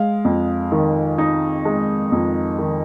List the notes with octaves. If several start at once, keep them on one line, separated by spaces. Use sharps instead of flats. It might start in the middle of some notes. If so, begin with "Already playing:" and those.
Already playing: G#3 F5
F2
D#3
D#4
G#3
F2
D#3